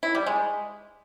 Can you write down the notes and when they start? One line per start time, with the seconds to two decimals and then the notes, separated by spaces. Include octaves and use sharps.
0.03 E4
0.15 G3
0.26 G#3